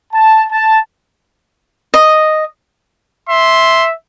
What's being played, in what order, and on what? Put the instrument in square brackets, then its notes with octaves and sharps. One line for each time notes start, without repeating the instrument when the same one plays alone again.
[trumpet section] A5
A5
[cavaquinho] D#5
[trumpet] E5 [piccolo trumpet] C6